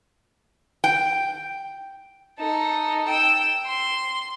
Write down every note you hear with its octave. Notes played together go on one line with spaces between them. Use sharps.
G5
D#4 A4
G5 E6
C6